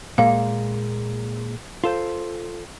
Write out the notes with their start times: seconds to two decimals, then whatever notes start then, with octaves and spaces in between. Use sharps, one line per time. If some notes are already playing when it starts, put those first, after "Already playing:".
0.18 A#2 G#3 A#3 F5
1.84 F4 A4 C5